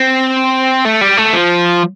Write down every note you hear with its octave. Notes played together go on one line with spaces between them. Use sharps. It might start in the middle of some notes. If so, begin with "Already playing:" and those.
Already playing: C4
A3
G3
A3
F3